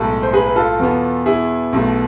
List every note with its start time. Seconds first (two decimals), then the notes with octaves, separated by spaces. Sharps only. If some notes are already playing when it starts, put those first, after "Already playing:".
Already playing: B1 A2 G#3 A4
0.23 C5
0.33 G#4 B4
0.46 B4
0.56 F4 A4
0.79 E2 B2 B3
1.26 E4 G#4
1.73 B1 B2 A3